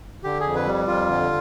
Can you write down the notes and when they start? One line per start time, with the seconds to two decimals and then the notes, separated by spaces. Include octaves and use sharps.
0.24 D3 G4
0.40 F2 G#4
0.55 B4
0.66 G3
0.87 F2 F4
1.09 D3